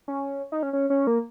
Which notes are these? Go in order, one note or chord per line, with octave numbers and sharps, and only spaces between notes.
C#4
D#4
C#4
C#4
C#4
A#3